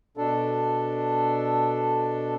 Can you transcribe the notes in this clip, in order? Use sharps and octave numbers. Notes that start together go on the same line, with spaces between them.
B2 D4 A4